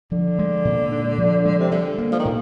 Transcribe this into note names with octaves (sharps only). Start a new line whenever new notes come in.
D3 F3
G#3
A#2
D4
F3
G#3
C3
D3 G3
A#3
F3
D#3
A#2